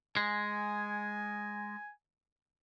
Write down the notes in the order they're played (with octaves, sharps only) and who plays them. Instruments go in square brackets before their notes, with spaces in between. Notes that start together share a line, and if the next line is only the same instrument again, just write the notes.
[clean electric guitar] G#3 [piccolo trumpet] G#5